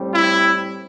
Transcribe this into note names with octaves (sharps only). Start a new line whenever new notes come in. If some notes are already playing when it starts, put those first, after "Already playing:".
Already playing: A2 G3 C4
E4